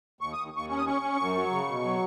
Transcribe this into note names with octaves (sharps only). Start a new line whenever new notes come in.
D#2 C#6
D#2 D#6
D#2 C#6
C#4 C#6
D#6
C#4 C#6
C#4
F#2
F#3
C#3
B2
F#3